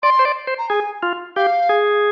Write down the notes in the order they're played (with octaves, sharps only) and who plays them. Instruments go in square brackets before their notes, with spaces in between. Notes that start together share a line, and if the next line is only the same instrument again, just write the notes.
[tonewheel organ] D5 [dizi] C6
[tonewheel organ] C5
D5
C5
[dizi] A#5
[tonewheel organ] G#4 [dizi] G#5
[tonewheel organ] F4
[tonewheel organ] G4 [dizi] F5
[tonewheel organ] G#4